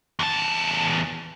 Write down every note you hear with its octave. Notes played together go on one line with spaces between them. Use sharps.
E2 A5